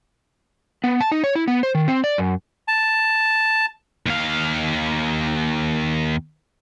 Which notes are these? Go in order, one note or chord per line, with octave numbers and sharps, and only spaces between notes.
B3
A5
D#4
C#5
E4
B3
C5
D#3
C4
D5
F#2
A5
D#2 F5